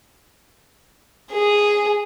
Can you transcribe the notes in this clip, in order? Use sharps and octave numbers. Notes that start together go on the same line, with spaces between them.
G#4